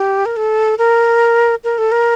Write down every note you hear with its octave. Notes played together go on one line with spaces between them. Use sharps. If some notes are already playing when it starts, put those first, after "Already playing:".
Already playing: G4
A#4
A4
A#4
A#4
A4
A#4